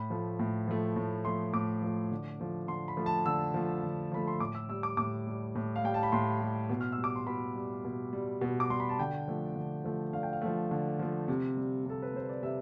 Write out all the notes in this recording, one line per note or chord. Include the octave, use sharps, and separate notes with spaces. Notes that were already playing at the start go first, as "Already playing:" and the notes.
Already playing: A2 B5
F3 A3
A2
F3 A3
A2
F3 A3 C6
A2 D6
F3 A3
D3
F3 A3
D3 C6
B5
F3 A3
A5
D3 E6
F3 A3
D3
F3 A3 B5
C6
A2 D6
E6
G3 E6
D6
A2 D6
G3
A2
F5
G3 G5
A5
B5
A2 C6
G3
B2
F6
E6
G3
D6
C6
B2 B5
G3
B2
G3
B2
D6
G3 C6
B5
A5
D3 G5
F3 A3
D3
F3 A3
D3 F5
G5
F5
F3 A3
D3
F3 A3
C3
G3
C3 A4
B4
G3 C5
D5
C3 E5